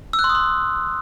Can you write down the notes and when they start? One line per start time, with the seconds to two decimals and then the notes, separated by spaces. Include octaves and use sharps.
0.13 E6
0.19 F#6
0.24 C6
0.29 D#6
0.35 C6